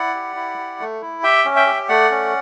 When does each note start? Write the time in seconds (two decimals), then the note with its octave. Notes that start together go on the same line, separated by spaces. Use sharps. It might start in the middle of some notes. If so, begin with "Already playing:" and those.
Already playing: E4 D5 F#5
0.15 G4
0.36 E4
0.58 G4
0.80 A3
1.02 E4
1.23 G4 E5 G5
1.45 C#4
1.56 E5 G5
1.66 G4
1.89 A3 D5 F#5
2.11 C#4